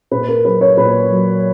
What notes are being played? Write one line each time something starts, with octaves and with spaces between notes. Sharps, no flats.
A#2 B4
A#4
F#3 B4
C#5
A#2 B4
F#3